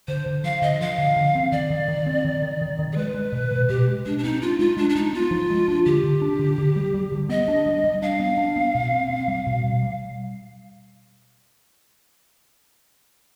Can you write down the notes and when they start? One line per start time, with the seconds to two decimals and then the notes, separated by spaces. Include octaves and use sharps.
0.08 D3 C5
0.26 D3
0.44 F3 F5
0.62 D3 D#5
0.81 F3 F5
0.98 D3
1.16 D3
1.35 C4
1.52 D#3 D5
1.70 D#3
1.88 D#3
2.06 C4
2.25 D#3
2.42 D#3
2.62 D#3
2.79 D#3
2.93 G#4
2.96 G#3 B4
3.14 G#3
3.32 B2
3.52 B2
3.69 B2 G4
3.88 G#3
4.06 G#3 D4
4.18 D4
4.23 C4 D#4
4.42 D4 F4
4.59 G#3 F4
4.77 G#3 D4
4.90 D4
4.95 G#3 D#4
5.13 B3 F4
5.31 F3
5.50 G#3
5.68 D4
5.86 D3 G4
6.04 D3
6.22 D4
6.39 D3
6.58 D3
6.76 G3
6.94 G3
7.12 D3
7.29 B3 D#5
7.48 D4
7.66 G3
7.84 G3
8.02 D4 F5
8.20 B3
8.38 D4
8.56 B3
8.75 B2
8.92 C4
9.10 C4
9.28 G3
9.47 B2
9.64 B2
9.83 G3